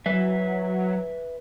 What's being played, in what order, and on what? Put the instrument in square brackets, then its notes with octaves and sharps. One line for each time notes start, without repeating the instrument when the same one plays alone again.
[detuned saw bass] F#3 [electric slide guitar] B4 E5